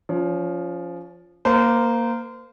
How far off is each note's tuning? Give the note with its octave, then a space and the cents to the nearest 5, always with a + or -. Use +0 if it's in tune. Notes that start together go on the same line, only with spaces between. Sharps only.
F3 +0 C#4 +30
A#3 +0 C5 -30